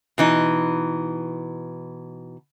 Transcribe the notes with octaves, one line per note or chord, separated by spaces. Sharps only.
B2 E3 D#4